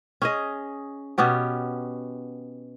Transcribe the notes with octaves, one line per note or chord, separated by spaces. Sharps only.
C#4 G#4 D#5
B2 B3 C#4 G4